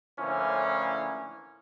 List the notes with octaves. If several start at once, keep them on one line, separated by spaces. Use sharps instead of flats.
A2 D3 E3 F3 A#3 C#4